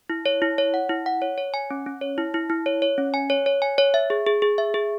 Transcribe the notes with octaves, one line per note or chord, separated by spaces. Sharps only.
E4
C#5
E4
C#5
F#5
E4
F#5
C#5
C#5
G#5
C#4
C#4
C#5
E4
E4
E4
C#5
C#5
C#4
G#5
C#5
C#5
G#5
C#5
E5
G#4
G#4
G#4
E5
G#4